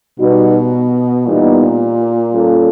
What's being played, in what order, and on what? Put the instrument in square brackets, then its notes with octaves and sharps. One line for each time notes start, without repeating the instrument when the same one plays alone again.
[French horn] B2 [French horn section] G3 B3 D#4 F#4
[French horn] A#2 [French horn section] E3 G3 B3 D#4
[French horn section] G3 A#3 C#4 F4 A4